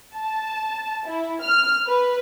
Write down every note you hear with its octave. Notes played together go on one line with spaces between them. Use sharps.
A5
E4
F6
B4